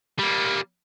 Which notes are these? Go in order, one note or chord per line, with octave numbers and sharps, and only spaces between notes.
G3 A#3